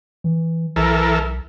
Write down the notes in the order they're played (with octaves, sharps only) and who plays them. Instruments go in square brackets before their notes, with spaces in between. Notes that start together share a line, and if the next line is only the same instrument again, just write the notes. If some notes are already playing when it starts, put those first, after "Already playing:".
[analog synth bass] E3
[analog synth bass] B1 [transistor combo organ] E3 A4 A#4